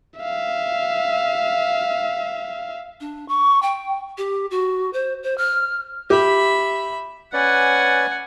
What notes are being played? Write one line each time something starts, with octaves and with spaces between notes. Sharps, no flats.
E5 F5
D4
C#6
G5
G4
F#4
C5
C5
F6
G4 E5 B5
C#4 B4 D5 F#5 G#5